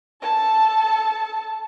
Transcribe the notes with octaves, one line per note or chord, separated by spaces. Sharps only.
A4 A5